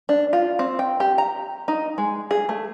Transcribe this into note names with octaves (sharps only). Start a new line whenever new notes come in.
D4
F4
C4
G5
G4
A#5
D#4
G#3
G#4
A3